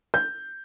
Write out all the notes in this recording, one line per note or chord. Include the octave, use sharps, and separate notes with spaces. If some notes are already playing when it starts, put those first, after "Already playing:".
G6